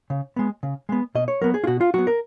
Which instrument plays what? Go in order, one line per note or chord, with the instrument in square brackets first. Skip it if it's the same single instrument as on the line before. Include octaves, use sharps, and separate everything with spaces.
[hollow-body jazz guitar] C#3
G#3 B3
C#3
G#3 B3
B2 D#5
C#5
F#3 B3 A#4
G#4
F4
B2 F#4
F4
F#3 B3 F#4
A#4